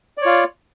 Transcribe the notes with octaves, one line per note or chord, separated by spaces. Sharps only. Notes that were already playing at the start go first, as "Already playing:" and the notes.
F4 C#5 D5